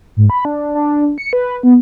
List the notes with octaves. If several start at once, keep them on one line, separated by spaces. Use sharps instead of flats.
G#2
B5
D4
D4
C#7
B4
B3